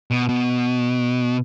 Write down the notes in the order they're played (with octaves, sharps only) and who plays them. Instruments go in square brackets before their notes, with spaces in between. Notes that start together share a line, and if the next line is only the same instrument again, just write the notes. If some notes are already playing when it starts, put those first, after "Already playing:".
[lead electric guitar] B2
B2